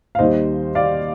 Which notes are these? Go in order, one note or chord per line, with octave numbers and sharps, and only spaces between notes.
F5
D#2 D#3 G3 C5 D#5
D5 F5